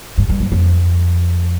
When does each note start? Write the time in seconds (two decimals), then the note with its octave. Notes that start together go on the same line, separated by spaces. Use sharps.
0.18 G2
0.30 G2
0.40 F2
0.52 F2